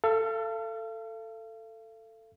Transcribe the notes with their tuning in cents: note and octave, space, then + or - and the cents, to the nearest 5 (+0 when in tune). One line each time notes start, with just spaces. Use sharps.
A4 +15 F5 -40